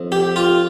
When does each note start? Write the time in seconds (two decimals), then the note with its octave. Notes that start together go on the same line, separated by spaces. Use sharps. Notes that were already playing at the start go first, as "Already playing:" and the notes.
Already playing: F2
0.12 G4
0.36 F4